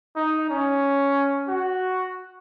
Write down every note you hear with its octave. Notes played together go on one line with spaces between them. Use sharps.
D#4
C#4
F#4